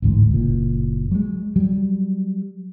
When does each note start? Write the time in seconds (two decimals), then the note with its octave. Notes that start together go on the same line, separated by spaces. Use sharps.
0.02 A1 D2 G#2
0.31 F#1 A#2
1.11 F#3 G#3
1.56 F#3 G3